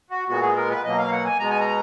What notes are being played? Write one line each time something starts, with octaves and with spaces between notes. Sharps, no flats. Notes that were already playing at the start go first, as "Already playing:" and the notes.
F#4
A#2 G#3 B3 F#4
G#4
A#4
B4
B2 F#3 A#3 D#5
F5
F#5
G#5
B2 G#3 B3 A#5
G#5
A#5